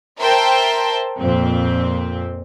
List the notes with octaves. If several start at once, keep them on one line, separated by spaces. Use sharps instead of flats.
A#4 C5 E5 G5 A5
F2 A#2 C4